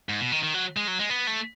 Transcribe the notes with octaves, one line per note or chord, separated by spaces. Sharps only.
G#2
B2
D#3
D#3
F#3
G#3
F#3
G#3
B3
A3